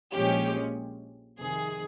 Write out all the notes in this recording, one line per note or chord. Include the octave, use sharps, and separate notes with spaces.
A#1 A#2 F3 G#3 C#4 G4
F2 C3 D#3 G#4